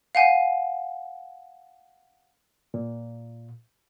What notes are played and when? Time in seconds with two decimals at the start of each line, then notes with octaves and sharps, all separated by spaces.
0.15 F5 F#5 G#5
2.74 A#2